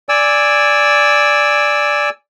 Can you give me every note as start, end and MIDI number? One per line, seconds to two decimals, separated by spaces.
0.09 2.09 74
0.09 2.09 80
0.09 2.09 88